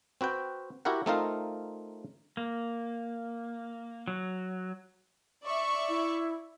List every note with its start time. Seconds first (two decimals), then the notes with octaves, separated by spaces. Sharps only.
0.21 C4 F#4 B4 G5
0.85 E4 F#4 G4 A#4 F#5
1.06 A3 C4 D#4 F4 A#4 F5
2.37 A#3
4.08 F#3
5.44 D5 E5 C#6
5.89 E4